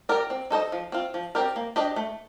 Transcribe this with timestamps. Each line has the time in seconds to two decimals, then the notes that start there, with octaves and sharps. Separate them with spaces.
0.09 G4 A#4 D5
0.30 C4
0.50 D#4 A4 C5 D#5
0.72 F3
0.92 C4 F4
1.14 F3
1.35 C4 G4 A#4 D5
1.56 A#3
1.76 D4 G4 C5 D#5
1.96 A3